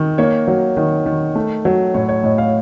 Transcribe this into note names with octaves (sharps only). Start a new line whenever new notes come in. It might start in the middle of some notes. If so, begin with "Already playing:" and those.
Already playing: D#3
A#3 C#5
F#3
D#3
D#3
A3
F#3
A2 C#5
C#5
A2 D#5
F5